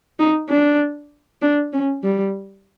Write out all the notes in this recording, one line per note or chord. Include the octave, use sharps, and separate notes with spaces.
D#4
D4
D4
C#4
G3